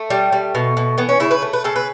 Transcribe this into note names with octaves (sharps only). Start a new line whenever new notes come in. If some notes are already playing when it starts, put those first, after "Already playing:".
Already playing: A3
G3
G3
B2
B2
E3 B3
C#4
C#3 E4
B4
A3
B4
C#3 A4
B4